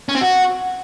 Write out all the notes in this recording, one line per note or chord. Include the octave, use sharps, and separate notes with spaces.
C#4
C4
F#4